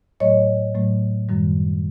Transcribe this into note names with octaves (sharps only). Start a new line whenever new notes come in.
A2 F#3 A3 C#5 D#5
A2 F#3 A3
F#2 D#3 G3